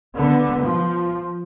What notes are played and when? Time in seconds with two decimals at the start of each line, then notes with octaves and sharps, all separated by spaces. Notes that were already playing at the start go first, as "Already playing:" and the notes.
0.14 D3 B3
0.61 F3